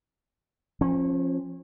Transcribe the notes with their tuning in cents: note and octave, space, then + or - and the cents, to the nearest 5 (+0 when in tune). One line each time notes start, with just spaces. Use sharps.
F3 +0 C#4 -35